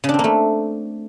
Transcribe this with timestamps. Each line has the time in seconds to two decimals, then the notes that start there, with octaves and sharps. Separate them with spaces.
0.04 C#3
0.09 D4
0.14 C4
0.19 A#3
0.24 A3